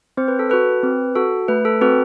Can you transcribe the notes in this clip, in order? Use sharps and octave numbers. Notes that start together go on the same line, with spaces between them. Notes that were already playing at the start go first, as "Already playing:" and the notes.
C4 C5
B4
A4
F#4 A4 B4
C4
F#4 A4
A3 B4
A4
C4 F#4 A4 B4